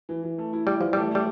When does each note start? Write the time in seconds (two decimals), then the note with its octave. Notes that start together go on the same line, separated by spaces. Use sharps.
0.09 E3
0.23 E3
0.38 A3
0.53 E4
0.67 G3 E4
0.81 E3 F3
0.93 G3 A3
1.11 G3 A3